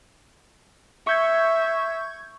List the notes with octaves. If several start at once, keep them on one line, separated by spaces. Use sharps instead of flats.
E5 C#6 G6 G#6